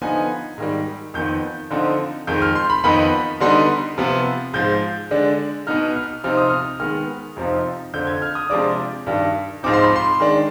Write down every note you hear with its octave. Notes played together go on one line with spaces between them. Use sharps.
D3 F3 B3 D#4 G#5
G#2 D#3 G3
F2 D#3 B3 G6
D3 F3 C4 D#4
F2 D#3 G#3 G6
F6
C6
B5
F2 D#3 B3 D#4 B5
D3 G3 B3 D#4 C6
C3 F3 B3
G#2 F3 G#3 G6
D3 G#3 D4
B2 B3 D#4 F6
F6
C3 F3 C4 D#4 F6
D#6
F6
D#3 G#3 B3 F6
F2 C3 F3 C4 D#4
F2 D3 F3 G6
G#6
F6
D#6
C3 F3 G#3 D4 D6
G2 D#3 G3
G#2 F3 C4 D#4 D6
C6
B5
C6
D#3 G#3 D4